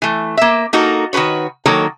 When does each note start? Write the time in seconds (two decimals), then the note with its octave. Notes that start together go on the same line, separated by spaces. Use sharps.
0.02 E3 A3
0.37 A#3 E5
0.73 A#3 D#4 F#4 A4 A#4
1.13 D#3 F#4 A4 B4 C#5
1.66 D#3 F#3 A#3 A4 C#5